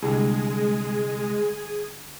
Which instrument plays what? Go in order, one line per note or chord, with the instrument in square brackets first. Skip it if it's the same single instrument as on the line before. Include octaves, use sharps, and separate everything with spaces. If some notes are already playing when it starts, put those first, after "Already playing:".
[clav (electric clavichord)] C2 [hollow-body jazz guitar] D3 G3 [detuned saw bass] G#3 [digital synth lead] G#4